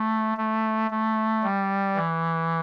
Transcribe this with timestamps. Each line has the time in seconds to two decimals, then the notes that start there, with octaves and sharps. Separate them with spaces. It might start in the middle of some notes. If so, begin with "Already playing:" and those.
Already playing: A3
0.37 A3
0.91 A3
1.43 G3
1.96 E3